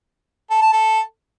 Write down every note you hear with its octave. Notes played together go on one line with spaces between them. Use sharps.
A4
A5
A4